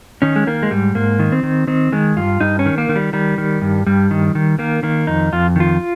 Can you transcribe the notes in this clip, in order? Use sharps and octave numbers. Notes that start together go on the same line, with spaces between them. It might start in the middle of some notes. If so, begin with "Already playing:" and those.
D#3 C#4
G#3
D#3 A#3
G#3
G#2 G3
G#2 A#3
D#3
C4
D#3
D#3 C4
D#3 G#3
G2 F4
G2 D#4
C#4
D#3
A#3
D#3
G3
D#3 G3
D#3
G2
G2 G3
D#3
D#3
D#3 A#3
D#3 A#3
F2 D#4
F2 F4
D#3 F4